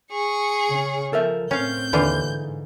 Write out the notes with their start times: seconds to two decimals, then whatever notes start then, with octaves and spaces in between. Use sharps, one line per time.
0.12 G#4 C#6
0.69 C#3 C#4
1.13 F3 A4 A#4 E5
1.51 A2 C4 C#4 F5 G6
1.93 D#2 D3 E3 F4
2.27 G#2